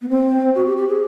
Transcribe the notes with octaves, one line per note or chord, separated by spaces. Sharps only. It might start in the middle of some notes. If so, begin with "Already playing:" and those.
B3
C4
F#4
G4
G4
G#4